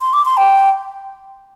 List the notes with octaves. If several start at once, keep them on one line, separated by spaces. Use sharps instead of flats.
C6
D6
C6
G5